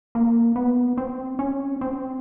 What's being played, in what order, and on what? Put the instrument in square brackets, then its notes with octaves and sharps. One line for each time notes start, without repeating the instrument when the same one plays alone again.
[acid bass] A#3
B3
C4
C#4
C4